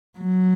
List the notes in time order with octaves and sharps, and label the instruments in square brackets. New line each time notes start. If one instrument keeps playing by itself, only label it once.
[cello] F#3